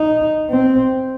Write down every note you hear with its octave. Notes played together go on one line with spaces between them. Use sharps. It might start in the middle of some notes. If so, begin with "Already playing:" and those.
Already playing: D#4
C4